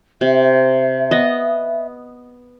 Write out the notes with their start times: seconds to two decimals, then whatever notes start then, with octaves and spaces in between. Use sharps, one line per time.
0.21 C3 E5
1.11 B3 D#5